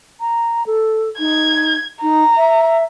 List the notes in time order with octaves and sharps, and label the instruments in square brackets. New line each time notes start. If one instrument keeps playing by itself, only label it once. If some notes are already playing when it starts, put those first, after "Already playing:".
[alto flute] A#5
A4
[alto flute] D#4 [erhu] G#6
[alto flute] D#4 [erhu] A#5
[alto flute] E5